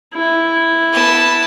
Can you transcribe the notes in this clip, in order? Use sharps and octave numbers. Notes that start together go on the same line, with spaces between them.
E4
B3 A5